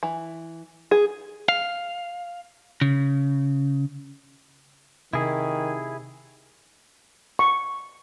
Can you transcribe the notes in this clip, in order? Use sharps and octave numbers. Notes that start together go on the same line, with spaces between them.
E3
G#4
F5
C#3
C3 D#3 E4 G#4
C#6